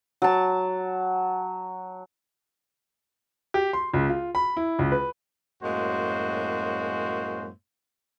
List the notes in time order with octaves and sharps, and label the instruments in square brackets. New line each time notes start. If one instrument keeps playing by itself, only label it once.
[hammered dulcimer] F#3 A5
[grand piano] G4
C6
C#2
F4
B5
E4
C#2
B4
[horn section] F#2 A2 G#3 A#3 F#4 C5